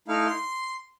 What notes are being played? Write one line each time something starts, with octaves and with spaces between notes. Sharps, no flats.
A3 D#4 E4 F5
C6